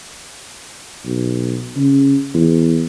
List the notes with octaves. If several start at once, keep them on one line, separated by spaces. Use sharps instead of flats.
B1
C#3
E2